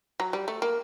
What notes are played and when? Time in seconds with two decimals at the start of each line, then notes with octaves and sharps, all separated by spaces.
0.20 F#3
0.33 G3
0.48 A3
0.62 A#3